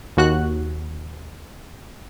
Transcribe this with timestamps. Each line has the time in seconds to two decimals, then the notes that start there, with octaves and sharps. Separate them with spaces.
0.17 D#2 F#4 F#6